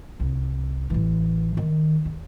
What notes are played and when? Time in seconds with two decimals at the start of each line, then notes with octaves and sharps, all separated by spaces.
0.20 C2
0.90 A1 E3
1.57 D#3
2.05 D#2